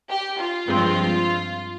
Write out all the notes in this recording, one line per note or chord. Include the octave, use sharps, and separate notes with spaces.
G4
F4
G2 F3 G#3 C4